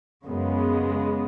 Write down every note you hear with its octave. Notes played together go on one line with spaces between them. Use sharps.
F#2 C#3 G#3 B3